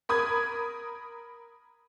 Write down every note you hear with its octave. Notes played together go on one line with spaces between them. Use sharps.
A#4 B5 D#6 G#6